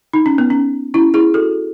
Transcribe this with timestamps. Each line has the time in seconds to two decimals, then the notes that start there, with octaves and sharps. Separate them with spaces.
0.13 D#4
0.26 C#4
0.38 B3
0.50 C#4
0.94 C#4 E4
1.14 E4 G#4
1.34 F#4 A4